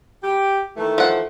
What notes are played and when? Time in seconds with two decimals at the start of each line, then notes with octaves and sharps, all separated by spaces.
0.23 G4
0.77 D#3 E3 A3
0.98 F3 F#5